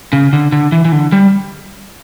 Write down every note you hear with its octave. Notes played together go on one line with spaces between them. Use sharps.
C#3
D3
D3
E3
E3
D3
G3